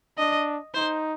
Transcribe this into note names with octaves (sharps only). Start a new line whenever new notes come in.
D4 D#5
D#4 C5